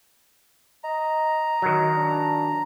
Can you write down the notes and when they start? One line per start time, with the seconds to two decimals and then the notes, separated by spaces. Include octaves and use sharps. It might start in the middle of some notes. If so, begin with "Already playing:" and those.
0.84 D#5 A#5
1.62 D#3 F#3
1.97 D4